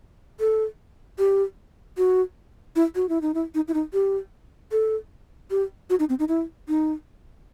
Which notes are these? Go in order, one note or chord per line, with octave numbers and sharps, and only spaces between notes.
A4
G4
F#4
E4
F#4
E4
D#4
E4
D#4
E4
D#4
G4
A4
G4
F#4
D#4
C4
D#4
E4
D#4